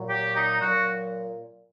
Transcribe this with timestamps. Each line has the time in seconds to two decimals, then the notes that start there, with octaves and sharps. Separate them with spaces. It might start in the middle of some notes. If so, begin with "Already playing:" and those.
Already playing: A#2 F#3
0.09 G4
0.35 D#4
0.61 A#2 F#3 F#4